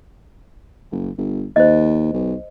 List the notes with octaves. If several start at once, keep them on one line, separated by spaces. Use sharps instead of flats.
F#1
G1
D#2 C5 D#5
B1